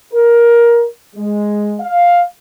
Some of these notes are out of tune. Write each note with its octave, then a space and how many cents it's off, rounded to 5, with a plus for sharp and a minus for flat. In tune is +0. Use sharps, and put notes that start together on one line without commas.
A#4 +15
G#3 +0
F5 +5